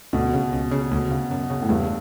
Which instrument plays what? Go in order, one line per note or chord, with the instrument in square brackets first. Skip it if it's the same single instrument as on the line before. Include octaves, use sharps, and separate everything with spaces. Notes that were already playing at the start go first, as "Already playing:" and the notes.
[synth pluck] D2 [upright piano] B2
[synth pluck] C#3
C#2
C#3
D2
C#3
F#2
C#3
[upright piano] A2
[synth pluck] E2 [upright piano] G2